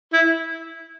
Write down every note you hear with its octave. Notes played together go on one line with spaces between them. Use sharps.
E4